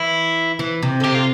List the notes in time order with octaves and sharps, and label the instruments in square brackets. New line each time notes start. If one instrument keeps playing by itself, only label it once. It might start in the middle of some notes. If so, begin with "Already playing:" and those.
Already playing: [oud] E3 [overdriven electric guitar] E4
[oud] E3
C3
D3
[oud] C3 [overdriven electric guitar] G4
[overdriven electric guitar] F4